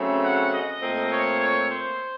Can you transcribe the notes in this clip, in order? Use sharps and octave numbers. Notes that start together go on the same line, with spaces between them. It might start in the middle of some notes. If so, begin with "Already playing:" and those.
Already playing: C#3 F#3 A3 C4
F#5
D#5
A#2 A3 C4
C#5
C#5
C5